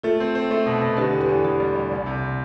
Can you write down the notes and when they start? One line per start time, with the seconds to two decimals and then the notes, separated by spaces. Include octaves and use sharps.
0.04 A3 F4 A4
0.20 C4
0.35 C4
0.51 A3
0.66 B2
0.81 B2
0.97 D3 G4 B4
1.13 E2
1.21 G4 B4
1.29 E2
1.35 A4
1.44 E2 E4 G4
1.60 G3
1.75 G3
1.91 C2
2.06 C3